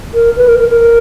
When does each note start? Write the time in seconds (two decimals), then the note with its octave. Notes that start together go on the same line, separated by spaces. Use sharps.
0.14 A#4
0.36 B4
0.48 A#4
0.59 A#4
0.70 A#4